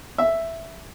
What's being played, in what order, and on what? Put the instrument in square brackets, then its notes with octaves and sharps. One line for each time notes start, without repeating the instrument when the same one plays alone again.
[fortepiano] E5